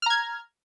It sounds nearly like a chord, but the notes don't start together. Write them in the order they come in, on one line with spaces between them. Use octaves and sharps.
F6 A#5 G#6